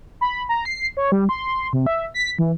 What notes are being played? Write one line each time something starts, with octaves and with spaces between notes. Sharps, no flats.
B5
A#5
C7
C#5
G3
C6
C3
E5
B6
E3